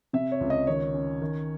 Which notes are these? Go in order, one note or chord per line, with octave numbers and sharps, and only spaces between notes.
C3 E5
C#5
C#2
D#5
D#3 C#5
C#4
D#3